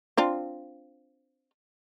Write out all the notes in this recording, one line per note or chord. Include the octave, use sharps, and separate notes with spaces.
C4 D4 F4